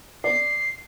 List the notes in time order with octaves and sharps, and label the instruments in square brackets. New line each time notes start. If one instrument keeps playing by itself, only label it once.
[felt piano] D5 [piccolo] C7